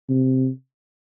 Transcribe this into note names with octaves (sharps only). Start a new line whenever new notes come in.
C3